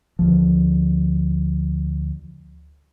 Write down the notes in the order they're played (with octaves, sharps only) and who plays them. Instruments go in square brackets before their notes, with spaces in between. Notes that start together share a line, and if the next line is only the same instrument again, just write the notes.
[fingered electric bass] D2 F3